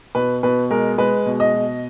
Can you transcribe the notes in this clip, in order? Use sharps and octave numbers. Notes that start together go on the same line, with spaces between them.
B2 B4
B2 B4
G#3 A#4
G#3 B4
B2
D#5
B2